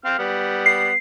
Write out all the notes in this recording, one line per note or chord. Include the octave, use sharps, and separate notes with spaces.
C4 F5 F6
G3 B3
C7